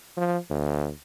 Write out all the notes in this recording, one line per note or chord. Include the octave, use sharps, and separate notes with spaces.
F3
D2